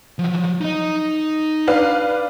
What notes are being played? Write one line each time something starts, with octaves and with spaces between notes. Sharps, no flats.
F3 F#3
D#4 D#5
D4 B4 F5